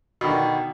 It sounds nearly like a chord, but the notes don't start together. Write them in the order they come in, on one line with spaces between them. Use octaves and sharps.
B2 D#3 D3